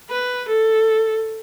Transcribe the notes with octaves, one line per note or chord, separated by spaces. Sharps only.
B4
A4